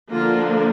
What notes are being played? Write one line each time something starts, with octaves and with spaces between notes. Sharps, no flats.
D3 F3 A#3 F4